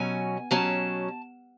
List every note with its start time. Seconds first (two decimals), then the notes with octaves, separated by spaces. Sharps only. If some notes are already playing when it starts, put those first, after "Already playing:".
Already playing: B2 F#3 C#4 G#5
0.51 B2 F#3 C#4 A5